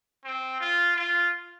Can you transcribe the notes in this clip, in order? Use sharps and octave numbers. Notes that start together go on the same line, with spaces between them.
C4
F4
F4